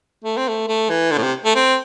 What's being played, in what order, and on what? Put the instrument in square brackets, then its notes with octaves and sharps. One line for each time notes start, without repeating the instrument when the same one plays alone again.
[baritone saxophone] A3
C4
A3
A3
E3
D3
A2
C3
A3
C4